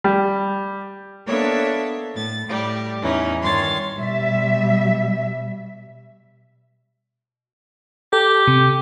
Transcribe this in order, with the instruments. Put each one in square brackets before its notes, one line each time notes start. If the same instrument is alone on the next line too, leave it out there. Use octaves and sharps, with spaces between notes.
[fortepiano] G3
[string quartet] A#3 B3 D4 A4 C#5 E5
A2 A6
A2 G3 G4
E2 E3 C#4 D#4
G2 D#3 C#5 C6 A6
[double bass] B2 [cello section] G3 E5
[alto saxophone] G4 [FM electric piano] A4
[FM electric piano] C3